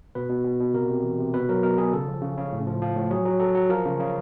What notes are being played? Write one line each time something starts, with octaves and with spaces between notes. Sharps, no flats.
B2 B4
B2
B2
B2
C3 A#4
C3
E3
C3
B2 B4
F#3 A#4
B2 A#4
B2 G#4
C#3 A4
F3
C#3
C#3
A2
F3
F3
A2
F#3 G#4
F#3
F#3 A4
F#3
F3 A#4
C#3
C#3